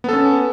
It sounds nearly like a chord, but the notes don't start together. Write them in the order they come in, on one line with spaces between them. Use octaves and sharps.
B3 A4 C#4